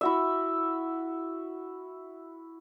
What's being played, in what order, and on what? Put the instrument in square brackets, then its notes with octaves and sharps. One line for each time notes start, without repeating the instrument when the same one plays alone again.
[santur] E4 F#4 E5